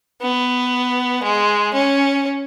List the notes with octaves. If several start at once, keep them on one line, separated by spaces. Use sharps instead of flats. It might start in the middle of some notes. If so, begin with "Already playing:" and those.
B3
G#3
C#4